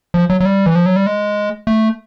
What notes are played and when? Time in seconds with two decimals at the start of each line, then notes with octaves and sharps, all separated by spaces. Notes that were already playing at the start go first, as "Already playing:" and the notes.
0.14 F3
0.30 F#3
0.40 F#3
0.45 G3
0.66 E3
0.75 F3
0.86 F#3
0.96 G3
1.06 G#3
1.67 A3